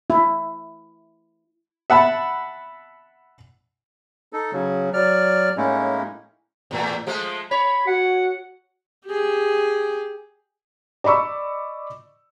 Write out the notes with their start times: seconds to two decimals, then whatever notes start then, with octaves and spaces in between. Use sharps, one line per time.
0.10 E4
1.90 E5 F#5 A5 B5
4.33 D#4 A4
4.52 C#3 F#3
4.94 F#3 D5 F6
5.57 A2 G#3 A#3 C#4 D#4 E4
6.71 E2 A2 A3
7.07 F3 G#3 A3
7.51 C#5 B5
7.87 F#4 F#5
9.06 G4 G#4
11.04 D5 D#5 B5 C#6 E6